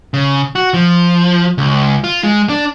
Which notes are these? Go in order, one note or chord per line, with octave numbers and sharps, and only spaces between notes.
C#3
F#4
F3
C#2
F4
G#3
D4